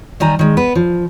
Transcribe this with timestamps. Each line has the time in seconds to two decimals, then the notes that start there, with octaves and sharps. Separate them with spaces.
0.20 D#3 G3 G#5 A#5
0.39 D#3 G#3
0.57 B3 B4
0.75 F3